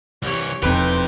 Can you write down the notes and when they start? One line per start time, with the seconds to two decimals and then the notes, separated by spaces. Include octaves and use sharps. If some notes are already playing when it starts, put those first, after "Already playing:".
0.22 C2 E3 G4 C#5
0.62 E1 F2 C4 D#4 G4 B4 C5